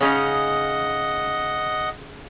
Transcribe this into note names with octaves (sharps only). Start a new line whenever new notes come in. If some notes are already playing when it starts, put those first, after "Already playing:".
C#3 C#4 D#4 D#5 F#5